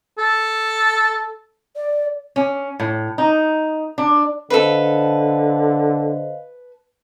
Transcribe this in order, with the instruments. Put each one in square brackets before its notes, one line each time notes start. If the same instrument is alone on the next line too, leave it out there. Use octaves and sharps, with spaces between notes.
[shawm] A4
[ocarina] D5
[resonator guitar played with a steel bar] C#4
A2
D#4
D4
[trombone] D3 [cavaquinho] A4 B4 [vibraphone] C5 D#5 F5